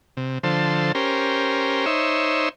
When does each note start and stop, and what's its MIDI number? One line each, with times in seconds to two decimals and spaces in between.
0.17 0.39 48
0.43 0.92 50
0.43 0.92 53
0.43 0.92 69
0.43 0.92 72
0.95 1.86 61
0.95 1.86 67
0.95 1.86 70
0.95 1.86 72
1.86 2.49 63
1.86 2.49 72
1.86 2.49 73
1.86 2.49 76